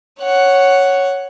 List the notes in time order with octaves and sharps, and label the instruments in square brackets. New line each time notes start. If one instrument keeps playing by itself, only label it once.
[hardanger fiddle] C#5 F#5